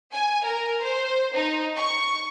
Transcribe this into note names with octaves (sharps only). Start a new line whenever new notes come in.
G#5
A#4
C5
D#4
C#6